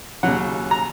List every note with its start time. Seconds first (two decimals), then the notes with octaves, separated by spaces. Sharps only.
0.23 D#2 C#3 F#3 F#5
0.71 A#5